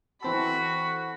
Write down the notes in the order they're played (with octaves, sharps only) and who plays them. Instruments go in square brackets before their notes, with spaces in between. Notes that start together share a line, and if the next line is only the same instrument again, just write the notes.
[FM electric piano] E3 C4 A4 [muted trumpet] F#4 [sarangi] B5